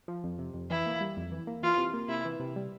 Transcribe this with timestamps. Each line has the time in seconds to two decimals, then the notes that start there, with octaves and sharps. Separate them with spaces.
0.08 F3
0.24 F2
0.39 C3
0.54 F2
0.70 E3 E4
0.86 A#3
1.01 G3
1.17 F2
1.32 E3
1.47 A#3
1.63 E3 F4
1.78 C3
1.93 A#3
2.08 C3 E4
2.25 E3
2.40 C3
2.56 G3